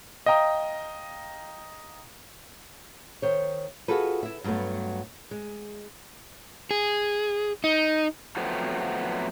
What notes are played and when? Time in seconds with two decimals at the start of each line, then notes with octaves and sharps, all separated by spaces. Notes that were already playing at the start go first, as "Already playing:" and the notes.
0.26 D#5 F5 G5 A#5 D#6
3.22 D#3 C5 C#5
3.88 F4 F#4 G#4 A4 B4
4.23 E4 E5
4.44 G2 F#3 G#3 A3 B3
5.31 G#3
6.71 G#4
7.64 D#4
8.37 F3 F#3 A3 B3 C4